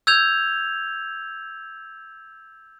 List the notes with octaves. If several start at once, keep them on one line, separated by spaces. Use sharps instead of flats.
E6 G6 G#6 F7